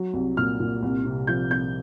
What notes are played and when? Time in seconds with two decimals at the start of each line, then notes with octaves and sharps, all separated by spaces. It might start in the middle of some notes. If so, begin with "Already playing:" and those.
Already playing: F#3
0.14 C2
0.37 A#2 F6
0.59 A#2
0.83 C2
1.05 C3
1.27 F3 G6
1.50 C2 G6